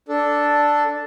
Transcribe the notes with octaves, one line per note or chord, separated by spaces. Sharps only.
D4 A4